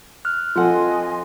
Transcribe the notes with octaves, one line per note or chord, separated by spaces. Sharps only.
F6 F#6
F3 C4 F4 A4 D#5 F#5 G#5 C6